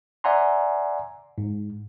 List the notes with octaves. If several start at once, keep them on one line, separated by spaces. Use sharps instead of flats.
D5 E5 F#5 G#5 A#5 C6
G#2